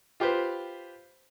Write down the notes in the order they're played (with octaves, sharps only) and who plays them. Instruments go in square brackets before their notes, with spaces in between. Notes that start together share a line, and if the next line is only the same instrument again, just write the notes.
[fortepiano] F4 G4 B4 C5